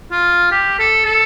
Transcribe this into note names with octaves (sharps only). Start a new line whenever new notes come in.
F4
G4
A4
A4